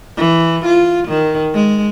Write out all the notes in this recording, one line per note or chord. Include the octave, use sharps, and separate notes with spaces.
E3
F4
D#3
G#3